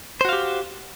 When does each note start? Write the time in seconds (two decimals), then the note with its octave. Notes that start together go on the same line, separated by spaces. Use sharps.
0.21 C5
0.25 F#4
0.29 F5
0.33 G4